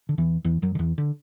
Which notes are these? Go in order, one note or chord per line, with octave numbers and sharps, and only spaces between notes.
D3
E2 E3
E2 E3
F#2 F#3
D3
E2 E3
D3